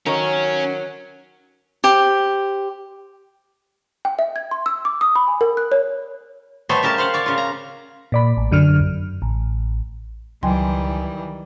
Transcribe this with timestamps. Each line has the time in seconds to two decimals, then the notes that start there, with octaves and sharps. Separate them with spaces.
0.06 D#3 F#3 C#4 A#4 C#5
1.84 G4 C5
4.05 G5
4.19 E5
4.36 G#6
4.51 C6
4.66 E6
4.85 D6
5.01 D#6
5.16 B5
5.28 G#5
5.41 A#4
5.57 F#6
5.72 C#5
6.69 G3 A3 B3 A4 C5 C#5
6.83 C#3 G4 A#4 A5
6.98 C5 F5 F#5
7.14 C#5 D5
7.26 C#3 F4
7.38 A#5
8.12 A#2 D5 B5
8.37 A1
8.51 F#2 D3 F6
8.80 F#2
9.22 A1
10.43 C#2 D#3 E3 F#3 G3 G5 G#5 C6